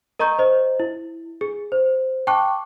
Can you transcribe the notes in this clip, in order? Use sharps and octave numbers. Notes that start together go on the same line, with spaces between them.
A#4 D#5 A#5 C#6 G6
C5 D#5
E4
G#4
C5
G5 A5 C#6 D6 F#6